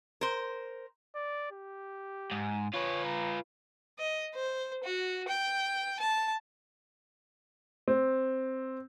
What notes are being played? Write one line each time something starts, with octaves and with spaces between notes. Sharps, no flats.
A#4 C5
D5
G4
G#2
F4 B4 C#5
A#5
D#5
C5
F#4
G5
A5
C4